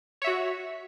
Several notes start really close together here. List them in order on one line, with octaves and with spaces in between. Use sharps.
C#5 E5 F#4